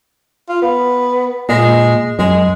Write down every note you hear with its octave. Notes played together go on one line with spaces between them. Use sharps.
F4
B3
A#2 G#3
F#2 G#3